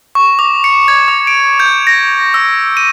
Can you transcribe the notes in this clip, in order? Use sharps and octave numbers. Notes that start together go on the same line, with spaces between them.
C#6
D6
C#7
G#6
D6
D7
G6
A#6
E6
D#7